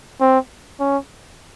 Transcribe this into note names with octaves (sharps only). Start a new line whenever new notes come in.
C4
C#4